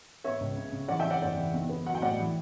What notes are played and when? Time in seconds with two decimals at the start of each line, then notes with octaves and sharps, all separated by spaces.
0.24 B3 C#5 E5
0.41 C#2
0.57 C#3
0.72 C#3
0.88 E3 D5 F#5
1.00 E5 G5
1.04 E3
1.10 D5 F#5
1.22 F#1 D5 F#5
1.37 E3
1.53 B1
1.69 B3
1.86 F#3 F#5
1.95 G5
2.02 A2 D5 F#5
2.19 E3